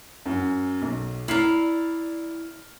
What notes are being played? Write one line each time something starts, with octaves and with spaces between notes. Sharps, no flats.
F#2
B1
E4 D5 A#5 F6 C7 F#7